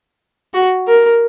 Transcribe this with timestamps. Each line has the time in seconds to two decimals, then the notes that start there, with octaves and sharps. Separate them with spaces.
0.54 F#4
0.88 A#4